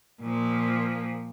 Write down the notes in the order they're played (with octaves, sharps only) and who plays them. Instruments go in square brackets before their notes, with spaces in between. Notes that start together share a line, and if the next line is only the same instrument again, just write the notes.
[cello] A#2 F3